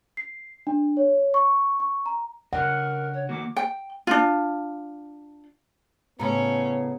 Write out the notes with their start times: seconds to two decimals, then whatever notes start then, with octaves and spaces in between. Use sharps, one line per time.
0.17 C7
0.67 D4
0.97 C#5
1.34 C#6
1.80 C#6
2.06 A#5
2.53 C#3 D4 A#4 D#5 F#5
3.13 C#5
3.29 D#3 A#3 F#4 D6
3.56 G5
4.07 D4 F4
6.20 A2 C#3 B3 C#4 A#5 B5